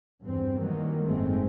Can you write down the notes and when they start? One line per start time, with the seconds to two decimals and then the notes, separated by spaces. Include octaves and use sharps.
0.23 E2 G2 C4
0.58 D#3 E3 F#3 G3 A#3
1.02 F#1 G#2 D#3 G#3 A3 C4